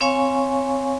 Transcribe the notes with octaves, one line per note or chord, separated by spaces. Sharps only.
C4 C#5 F5 G#5 C#6